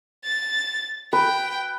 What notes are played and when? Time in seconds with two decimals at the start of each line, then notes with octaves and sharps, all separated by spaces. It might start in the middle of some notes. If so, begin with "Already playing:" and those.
0.25 A6
1.13 B4 G5